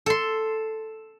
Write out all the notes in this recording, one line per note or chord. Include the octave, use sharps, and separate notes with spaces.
A4 C6